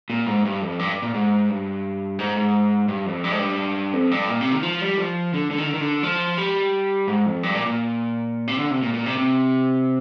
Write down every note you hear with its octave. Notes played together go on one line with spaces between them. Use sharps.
A#2
G#2
G2
F2
G2
A#2
G#2
G2
G#2
G#2
G2
F2
G2
G#2
G2
F2
G2
A#2
C3
D#3
F3
G3
F3
D3
D3
D#3
D3
D#3
D3
F3
G3
G#2
F2
G2
A#2
A#2
C3
D3
C3
A#2
A#2
C3
C3